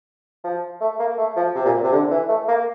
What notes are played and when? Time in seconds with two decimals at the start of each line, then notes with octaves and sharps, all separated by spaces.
0.44 F3
0.81 A3
0.99 A#3
1.18 A3
1.36 F3
1.55 C3
1.65 A#2
1.83 C3
1.92 D3
2.11 E3
2.29 A3
2.48 A#3